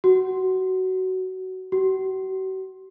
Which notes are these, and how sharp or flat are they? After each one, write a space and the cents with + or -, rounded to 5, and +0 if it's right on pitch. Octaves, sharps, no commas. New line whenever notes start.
F#4 +15
F#4 +40